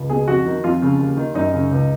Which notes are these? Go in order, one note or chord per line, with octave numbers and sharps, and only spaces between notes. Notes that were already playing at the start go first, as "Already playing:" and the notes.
Already playing: C#2
B2 G#4
F2 F#4
D#3
F2 F4
C#3
D#2
D#3
F#2 D#4
C#3
C#2